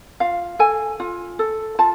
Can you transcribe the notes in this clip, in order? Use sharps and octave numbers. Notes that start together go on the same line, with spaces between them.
F4 F5
A4 G#5
F4
A4
F4 A5